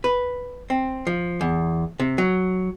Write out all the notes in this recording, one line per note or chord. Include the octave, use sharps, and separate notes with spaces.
B4
C4
F3
E2
C3
F#3